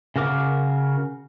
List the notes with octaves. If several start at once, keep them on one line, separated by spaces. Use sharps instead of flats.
C#3 F#4 A#4 D6